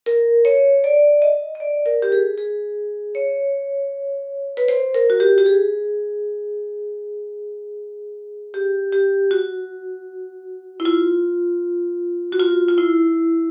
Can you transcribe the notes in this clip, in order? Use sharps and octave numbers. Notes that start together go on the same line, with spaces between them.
A#4
C#5
D5
D#5
D#5
D5
A#4
G4
G#4
G#4
C#5
B4
C5
A#4
F#4
G4
G4
G#4
G4
G4
F#4
E4
F4
F#4
F4
F4
E4